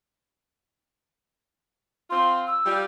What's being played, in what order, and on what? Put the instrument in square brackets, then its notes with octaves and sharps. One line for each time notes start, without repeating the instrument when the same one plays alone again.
[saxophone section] C4 F4 [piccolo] C6
[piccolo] E6
[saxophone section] G3 F4